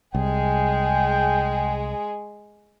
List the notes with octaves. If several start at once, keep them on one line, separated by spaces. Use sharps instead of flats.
C2 G#3 G#4 G5